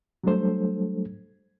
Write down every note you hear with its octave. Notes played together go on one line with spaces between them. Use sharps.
F#3 G3 A3 D4 A4 C5